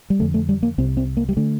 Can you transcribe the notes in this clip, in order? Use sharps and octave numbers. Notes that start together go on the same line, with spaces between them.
G3
F2 D3 A3
A3
G3
A#3
C2 C3 C4
C4
A#3
G3
D3 A3